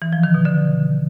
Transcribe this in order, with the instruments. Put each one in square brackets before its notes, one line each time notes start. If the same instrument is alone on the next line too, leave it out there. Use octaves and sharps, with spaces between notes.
[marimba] E3
F3
D#3
B2
D3